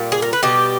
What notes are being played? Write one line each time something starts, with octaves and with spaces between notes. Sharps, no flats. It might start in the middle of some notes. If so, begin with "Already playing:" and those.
Already playing: A#2 G3
G#4
A#4
B4
B2 G3 G4